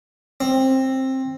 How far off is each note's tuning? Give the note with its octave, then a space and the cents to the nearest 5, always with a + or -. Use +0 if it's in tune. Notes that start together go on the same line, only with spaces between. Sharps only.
C4 +15